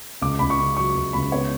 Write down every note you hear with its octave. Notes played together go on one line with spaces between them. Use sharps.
C#2 D6
C#2 B5
C#6
C#3
F#3 C#6
C#2
C#2 B5
B3 C#5